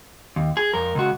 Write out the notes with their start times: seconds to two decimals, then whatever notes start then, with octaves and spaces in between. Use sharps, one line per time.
0.36 D#2
0.57 G#4
0.74 F2 A#4
0.95 C#2 F#4